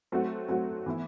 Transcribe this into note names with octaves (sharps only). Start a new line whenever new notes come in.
F#3 A3 C4 F#4
F#3 A3 C4 F#4
E3 B3 E4